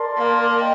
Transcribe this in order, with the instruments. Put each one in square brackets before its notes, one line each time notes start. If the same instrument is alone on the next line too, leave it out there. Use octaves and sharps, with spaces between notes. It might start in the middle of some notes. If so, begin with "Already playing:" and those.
Already playing: [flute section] A#4 D5 A5 C6
[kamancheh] A#3
[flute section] D#5 G5